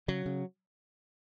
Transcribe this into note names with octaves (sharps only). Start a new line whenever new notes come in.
C#3 F#3
C#3